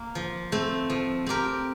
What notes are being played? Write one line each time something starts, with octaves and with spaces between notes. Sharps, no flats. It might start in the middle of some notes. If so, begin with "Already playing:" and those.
Already playing: A#3
F3
A3 C4
F3
C4 G4 A#4